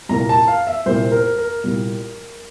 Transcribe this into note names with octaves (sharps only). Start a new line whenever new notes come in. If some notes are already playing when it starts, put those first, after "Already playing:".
C2 A#2 G3 A#3 A#5
A5
F5
E5
C2 A#2 G3 A#3 C5
A#4
A#4
C2 A#2 G3 A#3